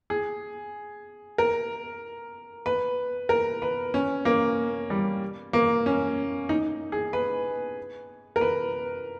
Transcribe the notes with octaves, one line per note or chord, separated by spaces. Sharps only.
G#4
A#4
B4
A#4
B4
C#4
A#3
G3
A#3
C#4
D#4
G#4
B4
A#4
B4